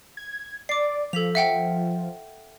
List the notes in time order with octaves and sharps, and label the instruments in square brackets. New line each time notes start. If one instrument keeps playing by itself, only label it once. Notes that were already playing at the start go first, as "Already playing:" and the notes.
[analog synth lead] G#6
[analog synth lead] D5 [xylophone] D6 C7
[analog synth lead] F3 [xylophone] A4 B6 F7
[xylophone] E5 F#5 G5